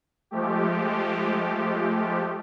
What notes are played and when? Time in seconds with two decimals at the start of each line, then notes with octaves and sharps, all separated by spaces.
0.31 F3 G#3 A3 G4